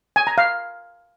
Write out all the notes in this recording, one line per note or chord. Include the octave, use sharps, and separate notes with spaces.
G#5
A#5
F5